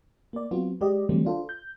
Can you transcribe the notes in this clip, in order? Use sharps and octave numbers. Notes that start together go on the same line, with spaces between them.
A#3 D5
F#3 B3 C4 F4 F#4
G#3 G4 D5 D#5
D3 E3 F#3 G3 A3 C4
D4 F4 A4 C5
G6